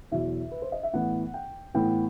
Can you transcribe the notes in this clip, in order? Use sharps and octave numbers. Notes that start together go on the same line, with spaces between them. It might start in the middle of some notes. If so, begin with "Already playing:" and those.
E2 B2 F#3 E5
B4
C5
D#5
E5
A2 E3 B3 F#5
G5
A2 E3 B3 G5